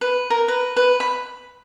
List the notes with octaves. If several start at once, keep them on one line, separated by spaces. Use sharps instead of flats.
B4
A#4
B4
B4
B5